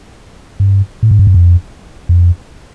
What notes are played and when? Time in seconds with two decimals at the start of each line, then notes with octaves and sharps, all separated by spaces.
0.60 G2
1.03 A2
1.11 G#2
1.19 G2
1.27 F#2
1.34 F2
2.09 F2